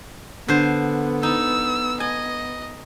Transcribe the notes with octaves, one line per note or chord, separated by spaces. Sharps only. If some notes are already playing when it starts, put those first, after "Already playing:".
D3 B3 C5
D#4 E6
D#5 G#5